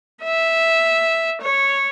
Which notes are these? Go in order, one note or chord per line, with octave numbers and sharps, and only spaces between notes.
E5
C#5